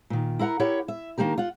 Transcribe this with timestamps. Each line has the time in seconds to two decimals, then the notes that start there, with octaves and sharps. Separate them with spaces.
0.10 A#2 D#3
0.39 E4 A#4 F5 F#5 A#5
0.60 E4 G4 A#4 C#5 F#5
0.88 E5
1.18 D#3 A#3 D4 G4 A#4
1.38 F4 F#5